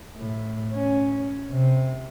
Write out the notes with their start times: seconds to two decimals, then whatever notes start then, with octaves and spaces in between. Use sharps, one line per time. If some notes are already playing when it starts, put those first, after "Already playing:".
0.16 A2
0.73 C#4
1.52 C3